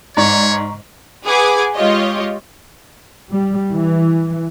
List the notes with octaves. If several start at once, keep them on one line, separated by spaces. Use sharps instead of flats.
G#2 C#5 D5 A#5 C#6
G#4 B4 F#5 G#5 D6 G#6
G#3 F4 G4 C#5 D#5
G3
E3